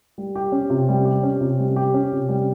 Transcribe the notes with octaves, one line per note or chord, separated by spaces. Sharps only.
G3
G4
C#4
C3
G3
G4
C#4
C3
G3
G4
C#4
C3
G3